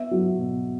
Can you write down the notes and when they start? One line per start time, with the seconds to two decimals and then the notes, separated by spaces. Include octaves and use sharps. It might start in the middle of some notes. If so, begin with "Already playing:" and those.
Already playing: B3 E5
0.11 F#3
0.38 B2